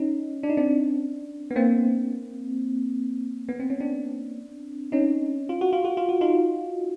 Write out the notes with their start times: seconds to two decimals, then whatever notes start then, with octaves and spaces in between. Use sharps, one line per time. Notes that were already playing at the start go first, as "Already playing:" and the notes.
Already playing: C#4 D#4
0.43 D4
0.49 D#4
0.57 C4 D4
1.51 B3
1.56 A#3 C4
3.49 B3
3.60 C4
3.70 C#4
3.80 C4 D4
4.92 C#4 D#4
5.49 F4
5.61 F#4
5.73 F4
5.85 F#4
5.97 F4
6.09 F#4
6.21 D#4 F4